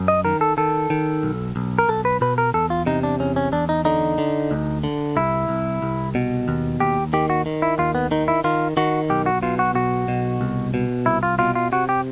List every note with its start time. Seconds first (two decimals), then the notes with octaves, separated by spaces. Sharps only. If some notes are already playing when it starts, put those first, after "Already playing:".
Already playing: F#2
0.08 D#5
0.25 D#3 A#4
0.41 A4
0.58 D#3 A4
0.90 D#3
1.23 B1
1.56 B1
1.79 A#4
1.88 B1 A4
2.05 B4
2.21 B2 B4
2.38 A#4
2.54 E2 A4
2.70 F4
2.86 C3 D#4
3.03 D4
3.20 E2 C#4
3.36 C#4
3.52 E2 D4
3.69 D#4
3.85 D3 D#4
4.18 D3
4.51 D2
4.84 D3
5.16 C2 E4
5.49 C2
5.82 C2
6.15 B2
6.48 D#2
6.80 D#2 G4
7.13 D#3 G4
7.30 F#4
7.46 D#3
7.62 E4
7.79 D#2 F4
7.95 B3
8.11 D#3 D#4
8.28 E4
8.44 D#3 F4
8.77 D#3 F#4
9.10 B1 G4
9.26 F#4
9.43 B2 F4
9.59 F#4
9.75 B1 F#4
10.08 B2
10.41 C2
10.74 B2
11.06 C2 E4
11.23 F4
11.39 B2 F4
11.55 F4
11.72 C3 F#4
11.89 G4